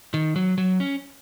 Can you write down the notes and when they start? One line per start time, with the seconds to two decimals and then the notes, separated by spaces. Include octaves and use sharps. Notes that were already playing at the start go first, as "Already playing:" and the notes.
0.14 D#3
0.36 F#3
0.58 F#3
0.80 C#4